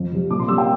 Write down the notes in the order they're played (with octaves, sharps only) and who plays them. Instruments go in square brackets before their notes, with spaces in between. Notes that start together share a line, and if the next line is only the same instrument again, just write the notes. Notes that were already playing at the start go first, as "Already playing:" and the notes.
Already playing: [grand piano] F2
C3 G3
A#2 D6
C6
G3 E6
G5